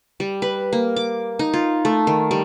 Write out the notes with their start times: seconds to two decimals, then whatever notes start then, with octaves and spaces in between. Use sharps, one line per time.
0.20 G3
0.42 B4
0.73 A#3
0.96 D6
1.39 D#4
1.54 F4
1.85 A3
2.07 D#3
2.31 G3